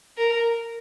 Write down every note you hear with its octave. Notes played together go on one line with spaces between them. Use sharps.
A#4